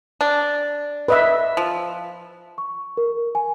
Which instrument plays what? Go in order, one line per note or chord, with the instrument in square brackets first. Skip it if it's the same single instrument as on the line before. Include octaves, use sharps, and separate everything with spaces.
[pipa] D4
[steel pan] B4 D#5 E5
[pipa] F3
[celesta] C#6
A#4
G#5